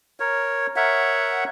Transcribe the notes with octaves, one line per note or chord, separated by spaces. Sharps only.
A#4 C#5
A#4 C#5 E5 F#5